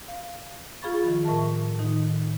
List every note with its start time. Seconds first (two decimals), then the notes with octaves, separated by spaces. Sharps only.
0.08 F5
0.82 F4 G#4 F5 B5 C#6 A6
1.03 D#3 F3
1.25 A2 A#4 E5 A5
1.78 A2 D#3 D#4